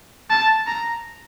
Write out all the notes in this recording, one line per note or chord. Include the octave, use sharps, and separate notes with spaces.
A5
A#5